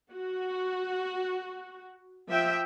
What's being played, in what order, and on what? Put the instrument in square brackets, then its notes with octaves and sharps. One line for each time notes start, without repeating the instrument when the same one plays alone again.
[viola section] F#4
F3 E5 G5